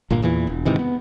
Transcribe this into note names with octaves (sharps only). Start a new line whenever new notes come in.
G1 A#2 A#3
E2 A#2 E3
E1
G#2 C3 D#3 E3
B3